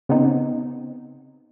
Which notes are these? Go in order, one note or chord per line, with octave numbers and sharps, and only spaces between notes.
C#3 B3 C4 D#4